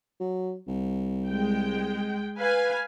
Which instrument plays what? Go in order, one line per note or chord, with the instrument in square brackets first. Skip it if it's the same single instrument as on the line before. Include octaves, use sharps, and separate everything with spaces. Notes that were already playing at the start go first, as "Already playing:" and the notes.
[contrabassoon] F#3
C2
[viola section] G#3 G5
B4 F5 G#5